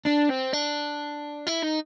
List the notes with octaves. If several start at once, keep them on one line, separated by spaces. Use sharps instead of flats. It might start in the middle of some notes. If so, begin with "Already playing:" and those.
D4
C4
D4
E4
D#4